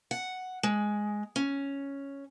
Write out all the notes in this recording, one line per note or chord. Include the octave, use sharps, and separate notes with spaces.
F#5
G#3
C#4